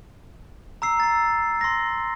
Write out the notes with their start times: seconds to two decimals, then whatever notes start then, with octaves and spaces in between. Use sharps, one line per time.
0.82 A#5 E6 C7
1.00 A6 C7
1.61 C6 A#6